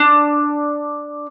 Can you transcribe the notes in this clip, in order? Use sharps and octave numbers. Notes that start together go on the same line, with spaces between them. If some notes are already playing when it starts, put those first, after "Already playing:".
Already playing: D4